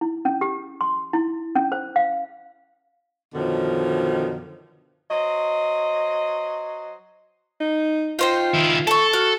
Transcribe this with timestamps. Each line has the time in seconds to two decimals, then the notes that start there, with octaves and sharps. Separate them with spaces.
0.01 E4
0.25 C#4
0.41 G4
0.81 C6
1.13 E4
1.55 C#4
1.72 C5
1.96 F5
3.35 F#2 B2 D3 D#3 F3
5.09 F#3 C5 D#5
7.60 D#4
8.19 D#4 F4 C5 G5
8.54 D#3 E4
8.87 A4 A5 C#6
9.13 F#4 F6